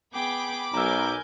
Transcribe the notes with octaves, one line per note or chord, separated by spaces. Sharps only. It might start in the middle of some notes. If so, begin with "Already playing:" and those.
B3 G#4 G5 B5 D6
B1 A#4 G#5 A#5 E6 G6